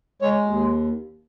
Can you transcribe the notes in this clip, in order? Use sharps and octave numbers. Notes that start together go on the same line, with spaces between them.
G#3 C#5
D#2